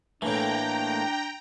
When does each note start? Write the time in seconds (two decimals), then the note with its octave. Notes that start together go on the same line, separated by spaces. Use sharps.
0.22 A2 E3 A3 A#3 D4 G5 A#5